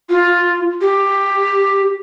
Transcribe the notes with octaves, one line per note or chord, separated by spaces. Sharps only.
F4
G4